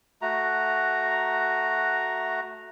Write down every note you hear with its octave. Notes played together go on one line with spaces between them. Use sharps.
A3 F#4 A#5